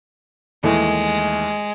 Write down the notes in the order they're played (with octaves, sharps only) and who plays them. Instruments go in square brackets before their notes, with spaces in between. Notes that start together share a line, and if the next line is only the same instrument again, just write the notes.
[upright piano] D#2 E3 A3 [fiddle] G#3